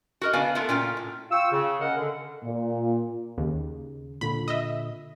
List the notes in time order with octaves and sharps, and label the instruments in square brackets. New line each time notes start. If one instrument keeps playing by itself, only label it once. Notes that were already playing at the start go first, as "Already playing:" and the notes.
[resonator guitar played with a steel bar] F#4 A#4 D#5
C#3 B3 D4 D5 F5 G#5
A3 B3 F4 A4 A#4
A#2 C#4 F4 G5
A2
[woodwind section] F4 G5 C#6 E6
C#3
A#3 C#4 A#4 D#5 F#5
D3
[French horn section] A#2
[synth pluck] D#2 [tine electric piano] C#3
[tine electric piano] A#2 D3 [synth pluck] B5
[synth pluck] D#5 E5